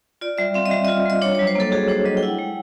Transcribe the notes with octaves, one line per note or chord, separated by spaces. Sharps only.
F4 D5
G3 E5
C4 F5
D#5
G3 E5
F4 D#5
G3 D#5
D4 C#5
F#3 C#5
C5
A#3 A4
F#4 G#4
D4 C5
F#3 D#5
G5
E4 F#5
G#3